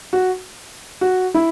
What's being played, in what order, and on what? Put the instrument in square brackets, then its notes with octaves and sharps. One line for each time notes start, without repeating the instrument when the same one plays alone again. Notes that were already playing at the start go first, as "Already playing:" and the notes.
[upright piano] F#4
F#4
E4